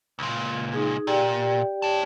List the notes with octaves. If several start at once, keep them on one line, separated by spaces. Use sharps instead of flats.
C#2 A#2
D#4 G#4
A#2 G4 D5 G5
C#5 A5